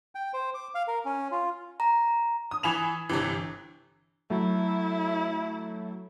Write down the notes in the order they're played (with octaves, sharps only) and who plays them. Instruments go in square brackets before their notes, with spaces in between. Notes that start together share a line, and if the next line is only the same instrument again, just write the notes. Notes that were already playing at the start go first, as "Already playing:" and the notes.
[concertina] G5
C5
D6
F5
A#4
C#4
F4
[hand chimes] A#5
[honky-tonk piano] D#6
E3 G#5 B5 E7 F7
G1 C3 E3
[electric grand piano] F#3 A3 [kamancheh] E4